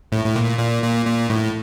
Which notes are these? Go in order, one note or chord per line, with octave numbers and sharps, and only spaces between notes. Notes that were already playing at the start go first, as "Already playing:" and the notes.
A2
A2
A#2
A#2
A#2
A#2
A2